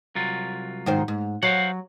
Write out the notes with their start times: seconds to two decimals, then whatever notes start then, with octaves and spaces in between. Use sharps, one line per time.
0.15 C2 F#3 F4
0.86 G#2 D#3 C5
1.08 G#2
1.43 F#3 C5 F5 F#5